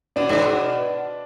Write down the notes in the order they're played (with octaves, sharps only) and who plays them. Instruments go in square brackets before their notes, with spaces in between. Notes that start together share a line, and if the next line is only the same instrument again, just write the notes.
[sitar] B2 [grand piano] D4
[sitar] G#2
B2